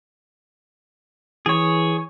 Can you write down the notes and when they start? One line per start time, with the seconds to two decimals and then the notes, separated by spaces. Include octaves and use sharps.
1.46 E3 G#4 C#5